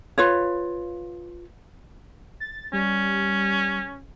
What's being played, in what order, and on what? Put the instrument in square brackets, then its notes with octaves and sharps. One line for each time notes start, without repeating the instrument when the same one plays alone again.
[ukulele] F4 B4 C#5
[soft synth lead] A6
[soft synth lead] G3 [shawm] C#4